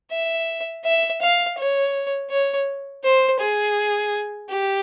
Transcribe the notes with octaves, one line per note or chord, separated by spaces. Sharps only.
E5
E5
F5
C#5
C#5
C5
G#4
G4